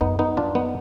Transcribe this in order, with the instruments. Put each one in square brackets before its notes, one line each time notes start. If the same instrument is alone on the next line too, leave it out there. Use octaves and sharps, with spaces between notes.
[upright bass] F#2 [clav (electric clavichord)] B3 D#4
[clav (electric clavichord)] B3 D#4
D4 F4
B3 D#4